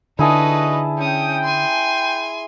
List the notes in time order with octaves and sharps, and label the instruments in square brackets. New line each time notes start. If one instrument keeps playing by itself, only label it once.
[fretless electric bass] D3 [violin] D#4 B4 [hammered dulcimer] E4 G#4 A5 [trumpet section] F#4 D#5
[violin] C#4 D#6 [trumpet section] G5
[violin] G#5 C6